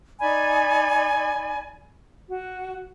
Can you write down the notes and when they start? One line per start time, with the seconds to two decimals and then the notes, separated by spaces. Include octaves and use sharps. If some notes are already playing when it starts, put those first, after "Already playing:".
0.20 D#4 D5 G#5 B5
2.30 F#4